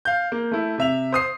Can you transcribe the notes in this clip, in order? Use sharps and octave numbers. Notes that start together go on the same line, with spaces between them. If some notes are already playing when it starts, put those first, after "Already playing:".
F5 G6
A#3
A3 E4
C3 E5 F7
C5 D#6 C7